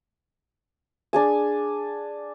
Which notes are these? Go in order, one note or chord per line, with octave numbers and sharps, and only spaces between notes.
D4 G#4 G#5